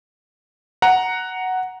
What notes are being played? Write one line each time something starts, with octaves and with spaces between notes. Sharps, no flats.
F#5 A#5